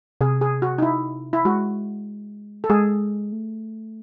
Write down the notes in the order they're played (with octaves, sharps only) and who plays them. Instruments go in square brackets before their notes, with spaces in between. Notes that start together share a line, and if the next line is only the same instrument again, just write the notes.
[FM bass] C3 [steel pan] G#4
[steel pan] G#4
F#4
D#4
E4
E4
[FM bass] G#3 [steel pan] F#4
[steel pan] A4
[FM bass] G#3 [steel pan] G#4
[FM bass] A3